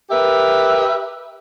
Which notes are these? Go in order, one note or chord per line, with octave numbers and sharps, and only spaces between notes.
G4 A#4 B4 E5